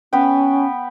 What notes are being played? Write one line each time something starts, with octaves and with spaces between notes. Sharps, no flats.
B3 C#4 B4 G5